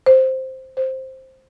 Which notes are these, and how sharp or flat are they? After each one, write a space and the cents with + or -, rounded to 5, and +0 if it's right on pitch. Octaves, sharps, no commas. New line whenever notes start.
C5 +5
C5 +10